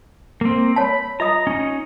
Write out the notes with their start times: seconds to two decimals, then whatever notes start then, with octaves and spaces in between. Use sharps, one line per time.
0.41 A#3 C4
0.76 C#5 A5 B5
1.20 F4 D#5 A#5 D#6
1.47 C#4 D#4